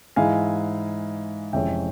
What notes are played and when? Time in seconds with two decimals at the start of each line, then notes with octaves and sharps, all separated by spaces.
0.16 G#2 E3 G#3 E4 F5 G#5
1.53 F1 F2 E3 G#3 C#4 E5 G5